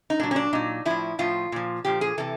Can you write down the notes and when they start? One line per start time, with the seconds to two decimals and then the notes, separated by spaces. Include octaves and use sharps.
0.10 D#4
0.20 A#2 F#3 D4
0.31 C#4
0.36 D4
0.53 A#2 F#3 D#4
0.85 A2 F3 E4
1.19 A2 F3 F4
1.52 A#2 F3
1.85 A#2 F3 G4
2.01 G#4
2.18 C3 E3 A4